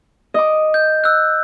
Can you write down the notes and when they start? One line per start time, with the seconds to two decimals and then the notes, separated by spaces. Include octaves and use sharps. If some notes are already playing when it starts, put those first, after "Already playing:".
0.34 D#5 D6
0.74 G6
1.04 E6 F#6